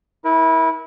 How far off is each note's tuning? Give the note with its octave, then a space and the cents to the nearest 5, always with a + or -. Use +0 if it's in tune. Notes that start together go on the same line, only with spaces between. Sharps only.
E4 -25 A#4 +25